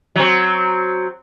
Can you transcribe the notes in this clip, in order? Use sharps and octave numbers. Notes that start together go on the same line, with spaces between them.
F#3 C4